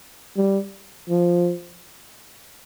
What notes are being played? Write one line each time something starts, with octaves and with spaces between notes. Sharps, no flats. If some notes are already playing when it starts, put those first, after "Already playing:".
G3
F3